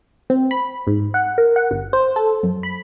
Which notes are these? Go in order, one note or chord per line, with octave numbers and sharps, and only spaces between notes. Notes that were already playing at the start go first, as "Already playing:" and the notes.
C4
B5
G#2
F#5
A#4
F#5
G1
C5
A4
F#2
B5